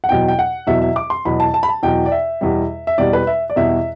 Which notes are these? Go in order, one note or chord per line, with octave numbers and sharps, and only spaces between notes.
F#5
E2 B2 F#3 G5
G5
F#5
E2 B2 F#3 E5
E5
D6
C6
E2 B2 F#3 B5
A5
A5
B5
A5
E2 B2 F#3 G5
D5
E5
E2 B2 G3
E5
E2 B2 G3 D5
B4
E5
D5
E2 B2 G3 E5